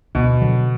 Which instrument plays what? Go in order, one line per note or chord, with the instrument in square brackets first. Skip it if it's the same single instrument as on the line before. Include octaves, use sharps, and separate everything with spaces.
[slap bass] D2 [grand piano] B2
[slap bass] D3 F#3